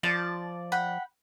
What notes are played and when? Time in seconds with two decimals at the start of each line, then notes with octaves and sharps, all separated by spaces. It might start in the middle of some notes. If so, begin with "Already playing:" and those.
0.03 F3 D5 A5
0.72 F#5 G5 B5